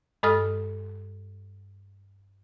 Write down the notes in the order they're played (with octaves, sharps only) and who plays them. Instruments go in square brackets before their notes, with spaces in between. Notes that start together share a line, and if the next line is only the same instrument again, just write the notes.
[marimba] G2 G#3 A4 D#5 D#6 F6